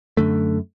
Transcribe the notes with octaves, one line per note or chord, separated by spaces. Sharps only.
F#2 D3 A3